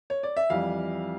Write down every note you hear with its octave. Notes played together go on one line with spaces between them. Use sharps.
C#5
D5
E5
F2 E3 G3 F5